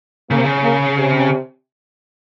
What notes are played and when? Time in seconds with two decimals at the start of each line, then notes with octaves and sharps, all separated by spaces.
0.31 C#3 A#3
0.38 C3
0.45 C#3
0.63 A#3
0.97 C3